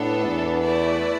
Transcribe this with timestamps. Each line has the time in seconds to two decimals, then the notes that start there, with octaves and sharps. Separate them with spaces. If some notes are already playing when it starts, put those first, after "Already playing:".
Already playing: A2 B3 D4 A4
0.25 E2
0.63 A3 E4 B4 D5